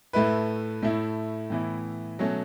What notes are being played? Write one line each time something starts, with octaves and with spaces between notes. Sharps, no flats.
A2 A3 E4 B4
A2 A3 E4
A2 E3 B3 E4
B2 F#3 A3 C#4